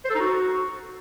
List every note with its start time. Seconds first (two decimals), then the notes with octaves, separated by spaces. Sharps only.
0.05 C5
0.10 A4
0.15 D#4
0.20 F#4